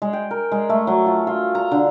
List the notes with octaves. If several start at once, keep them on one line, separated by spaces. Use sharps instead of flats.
G#3
G5
A#4
G#3
A3
F#3
F4
F4
A#5
D3